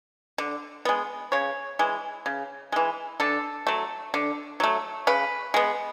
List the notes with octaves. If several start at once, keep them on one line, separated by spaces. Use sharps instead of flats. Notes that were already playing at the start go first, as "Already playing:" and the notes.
D3
G#3 B3
C#3 C#5
E3 G#3
C#3
E3 G#3
D3 A4
F#3 A3
D3
F#3 A3
C#3 B4
G#3 B3